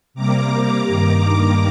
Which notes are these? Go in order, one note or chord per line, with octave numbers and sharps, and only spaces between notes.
C3 G3 A#3 A#5 D6
G2 D#3 A#3